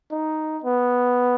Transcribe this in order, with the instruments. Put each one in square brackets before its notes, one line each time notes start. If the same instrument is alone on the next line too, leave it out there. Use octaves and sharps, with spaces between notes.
[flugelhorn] D#4
B3